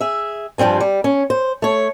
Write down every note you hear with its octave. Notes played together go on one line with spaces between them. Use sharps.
G#4 E5
G2 F3 G3 C4 G#5
G3
C#4
C5
A3 C#5